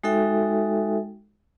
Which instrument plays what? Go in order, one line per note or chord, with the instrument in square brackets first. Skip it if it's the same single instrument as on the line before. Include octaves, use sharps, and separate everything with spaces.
[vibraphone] G#3 D#4 F#4 A4 E5 G5